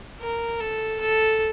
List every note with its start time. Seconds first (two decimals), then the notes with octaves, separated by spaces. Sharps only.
0.20 A#4
0.60 A4
1.00 A4